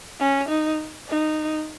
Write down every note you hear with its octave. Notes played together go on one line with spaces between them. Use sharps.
C#4
D#4
D#4